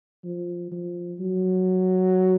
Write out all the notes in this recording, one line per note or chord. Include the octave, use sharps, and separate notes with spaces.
F3
F3
F#3